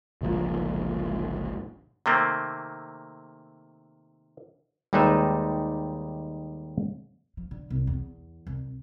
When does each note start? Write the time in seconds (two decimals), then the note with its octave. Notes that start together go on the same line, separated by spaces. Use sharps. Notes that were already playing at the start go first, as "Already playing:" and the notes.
0.21 G1 C#2 A#2 F3
2.06 C3 D#3 A3 A#3 C4
4.93 D#2 G3 G#3 D#4 B4 E5
7.37 F3
7.51 D3
7.70 C2
7.87 E2
8.47 C2